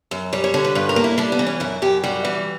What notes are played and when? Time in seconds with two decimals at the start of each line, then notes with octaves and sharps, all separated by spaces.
0.11 F#2
0.33 G3 C#5
0.44 C#5
0.54 D3 C#5
0.65 B4
0.75 G2 B4
0.89 A#4
0.96 A#3
1.04 E4
1.18 G3 D4
1.32 B3
1.39 E3
1.47 C#4
1.60 F#2 E4
1.82 F#2 G4
2.04 G3 F#4
2.25 E3